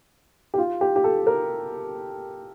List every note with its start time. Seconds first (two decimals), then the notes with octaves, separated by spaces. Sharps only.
0.54 G4
0.58 F4
0.81 G4
0.96 G4
1.04 A4
1.27 A#4